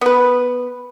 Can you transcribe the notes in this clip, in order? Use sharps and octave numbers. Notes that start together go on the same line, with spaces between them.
B3 B4